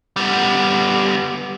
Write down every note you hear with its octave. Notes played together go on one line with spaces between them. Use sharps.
G3 B3